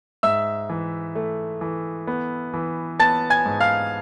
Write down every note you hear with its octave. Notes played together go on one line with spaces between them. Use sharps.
G#2 E5 E6
E3
A3
E3
B3
E3
B3 A5 A6
G#5 G#6
G#2
F5 F6